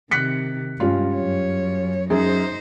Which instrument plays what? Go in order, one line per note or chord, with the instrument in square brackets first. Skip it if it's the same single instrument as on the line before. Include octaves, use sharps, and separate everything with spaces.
[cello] C3 D#3 [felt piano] F#6 B6 C#7
[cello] G2 G#3 [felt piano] G3 C#4 F4
[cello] F#2 C#5
[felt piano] F#2 G#4 [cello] D#4 C5